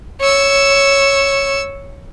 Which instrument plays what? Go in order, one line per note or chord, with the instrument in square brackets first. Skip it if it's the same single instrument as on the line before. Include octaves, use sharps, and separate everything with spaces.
[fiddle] C#5 E6